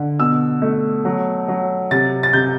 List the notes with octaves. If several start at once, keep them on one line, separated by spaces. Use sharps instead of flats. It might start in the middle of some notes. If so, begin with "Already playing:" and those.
Already playing: D3
B2 E6
A3
F#3
F#3
C3 A6
A6
C3 G6